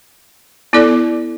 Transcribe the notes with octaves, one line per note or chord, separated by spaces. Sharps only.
B3 E4 A4 D5